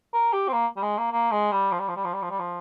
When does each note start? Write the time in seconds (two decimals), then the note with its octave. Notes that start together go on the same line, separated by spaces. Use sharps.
0.14 A#4
0.33 G4
0.48 C4
0.53 A#3
0.77 G3
0.83 G#3
0.98 A#3
1.12 A#3
1.32 G#3
1.52 G3
1.72 F3
1.79 G3
1.88 F3
1.96 G3
2.05 F3
2.13 G3
2.22 F3
2.30 G3
2.39 F3